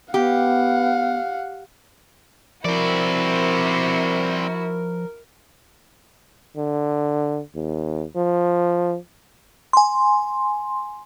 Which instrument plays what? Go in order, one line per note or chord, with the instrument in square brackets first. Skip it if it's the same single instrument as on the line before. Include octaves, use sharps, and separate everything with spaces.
[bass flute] B3 [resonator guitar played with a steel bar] G4 [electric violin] F5 F#5
[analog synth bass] F3 [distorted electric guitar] C4 D5 [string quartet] E4 F#4 [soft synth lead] A#4
[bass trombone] D3
D#2
F3
[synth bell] G#5 C6